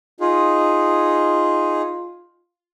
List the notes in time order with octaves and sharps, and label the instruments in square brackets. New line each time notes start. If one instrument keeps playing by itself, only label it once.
[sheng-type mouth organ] D#4 G#4 [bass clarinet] F4